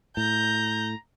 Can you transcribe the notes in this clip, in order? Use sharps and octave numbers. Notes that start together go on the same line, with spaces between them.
A2 A#5 G6